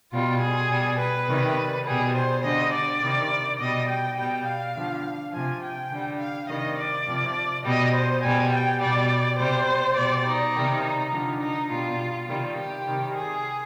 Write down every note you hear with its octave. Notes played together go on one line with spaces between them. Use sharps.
B2 G3 F4
G#4
B2 G3
B4
C3 D#3 G3
B2 G3 G#4
C5
D3 G3 D#5
D5
C3 D#3 G3
B2 G3 D#5
G5
B2 G3 G5
F5
D3 F3
C3 F3 G#5
G5
D3 G3
F5
C3 D#3 G3 D#5
D5
C3 F3
B2 G3 D#5
C5
B2 G3 G#5
G5
B2 G3 D5
C3 G3 C5
B2 G3 D5
D#4
C3 D#3 G3
D#4
D3 F3
D#4
B2 G3 F4
C3 D#3 G3 F4
G4
C3 D#3 G3
G#4